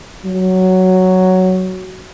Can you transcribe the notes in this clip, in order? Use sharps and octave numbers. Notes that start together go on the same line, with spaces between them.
F#3